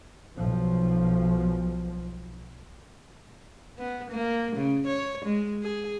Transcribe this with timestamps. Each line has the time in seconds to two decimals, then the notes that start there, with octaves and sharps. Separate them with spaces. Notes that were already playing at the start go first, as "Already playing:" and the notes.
0.38 B1 F3
3.79 B3
4.11 A#3
4.56 C#3
4.87 C#5
5.25 G#3
5.63 G#4